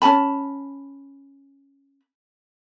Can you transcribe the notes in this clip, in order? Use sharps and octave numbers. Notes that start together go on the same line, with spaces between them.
C#4 A4 A5 B5